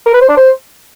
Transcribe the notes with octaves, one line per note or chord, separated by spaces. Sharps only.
A#4
B4
C5
D4
C5